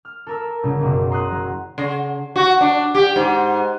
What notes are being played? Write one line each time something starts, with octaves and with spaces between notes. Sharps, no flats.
F6
A4 A#4 E6
G1 C#3
F#1 B1
A#5 C6 D#6 F#6
F#3
C#3
F#4
D4
G4
G#2